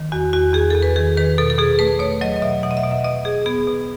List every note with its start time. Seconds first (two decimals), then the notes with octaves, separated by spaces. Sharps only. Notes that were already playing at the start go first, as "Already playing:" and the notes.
Already playing: D#3
0.12 E2 F#4
0.33 E2 F#4
0.54 E2 G#4
0.71 E2 A4
0.82 B4
0.96 D#3 G#4
1.17 D#3 B4
1.38 B2 A4
1.50 A4
1.58 B2 G#4
1.79 A3 B4
2.00 B2 C#5
2.21 F#3 D#5
2.36 D#5
2.42 B2 E5
2.63 B2 F#5
2.71 D#5
2.77 E5
2.83 B2
2.91 E5
3.05 B2 D#5
3.25 B2 G#4
3.46 B3 G#4
3.67 B2